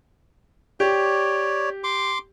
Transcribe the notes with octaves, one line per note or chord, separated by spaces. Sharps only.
G4 C#5 D5
C6 D6